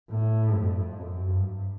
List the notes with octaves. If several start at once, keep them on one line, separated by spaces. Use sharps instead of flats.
A2
F2
F#2
G2